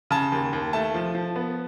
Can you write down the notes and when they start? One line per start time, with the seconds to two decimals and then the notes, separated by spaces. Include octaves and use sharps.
0.11 C#3 A5
0.32 D#2
0.53 D#2
0.73 A3 A5
0.94 F3
1.15 F3
1.36 B3